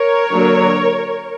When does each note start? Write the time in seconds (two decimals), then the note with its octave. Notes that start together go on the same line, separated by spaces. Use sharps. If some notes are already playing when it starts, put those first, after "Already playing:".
Already playing: A#4 C#5
0.31 D3 F#3 A#3 D4